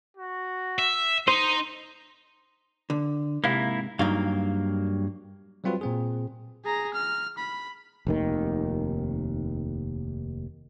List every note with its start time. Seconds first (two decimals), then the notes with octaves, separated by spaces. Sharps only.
0.17 F#4
0.79 E5
1.28 D#4 C5 D#5 C6
2.90 D3
3.44 G#2 C3 A#3 E4 F5
3.99 G2 F#3 A#3 D#4 F5
5.64 F#3 G3 C4 F4 F#4 B4
5.81 A#2 C4 G#4
6.65 G#4 A#5
6.94 F6
7.38 B5
8.07 F1 D#2 D#3